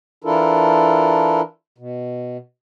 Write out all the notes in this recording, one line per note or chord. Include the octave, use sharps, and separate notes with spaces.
E3 D4 E4 F4 A4 A#4
B2